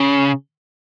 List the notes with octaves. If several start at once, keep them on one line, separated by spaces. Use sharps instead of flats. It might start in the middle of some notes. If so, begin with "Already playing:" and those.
Already playing: C#3